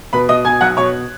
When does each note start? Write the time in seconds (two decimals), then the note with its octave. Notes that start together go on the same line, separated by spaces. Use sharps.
0.13 B2 B4 B5
0.29 B2 D#5 D#6
0.45 B2 G#5 G#6
0.61 B1 F#5 F#6
0.77 B2 C#5 C#6